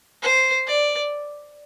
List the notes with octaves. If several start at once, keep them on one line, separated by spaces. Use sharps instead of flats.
C5
D5